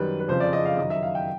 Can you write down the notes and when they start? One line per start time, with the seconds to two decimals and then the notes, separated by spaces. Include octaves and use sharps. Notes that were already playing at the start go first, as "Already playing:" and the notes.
Already playing: F#2 D#3 G3 B4
0.20 B4
0.28 F2 C#3 F3 C5
0.40 D5
0.53 D#5
0.65 F5
0.78 F#2 D#3 F#3 D#5
0.90 E5
1.02 F5
1.15 G5